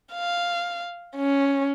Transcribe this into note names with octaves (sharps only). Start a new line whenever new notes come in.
F5
C#4